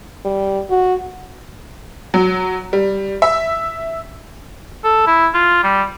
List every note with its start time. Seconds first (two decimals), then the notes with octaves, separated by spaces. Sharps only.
0.25 G3
0.70 F#4
2.14 F#3
2.73 G3
3.22 E5
4.85 A4
5.07 E4
5.34 F4
5.64 G3